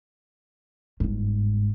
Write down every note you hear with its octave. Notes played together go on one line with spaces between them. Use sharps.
G1 G#2